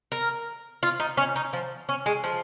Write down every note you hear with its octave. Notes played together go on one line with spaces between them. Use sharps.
A#4
F4
D#4
C#4
D#4
F3
C#4
G#3
F3